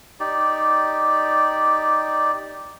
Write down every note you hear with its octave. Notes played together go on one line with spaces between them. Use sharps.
D#4 G4 D5